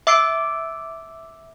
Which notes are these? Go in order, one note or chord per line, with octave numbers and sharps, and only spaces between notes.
E5 D6 E6 C7 D7